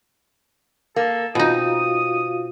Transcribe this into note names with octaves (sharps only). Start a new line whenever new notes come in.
A#3 A4
B2 C4 D#4 F4 F#4 F5 D#6